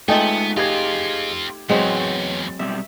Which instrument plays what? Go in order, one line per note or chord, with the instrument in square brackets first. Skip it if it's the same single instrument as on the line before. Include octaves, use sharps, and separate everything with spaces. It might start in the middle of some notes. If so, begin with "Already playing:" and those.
[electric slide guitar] G#3 F4 [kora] A3 D#4 E5 [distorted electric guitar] B3 [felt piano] G5 G#5
[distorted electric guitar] C4 F4 [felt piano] G4 G#6 [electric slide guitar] G#4 D#5 F5
[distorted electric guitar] E2 A2 [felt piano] F#3 [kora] G#3 C4 [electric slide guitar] B4 C#5 F#5
[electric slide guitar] B2 G3 C4 [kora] E5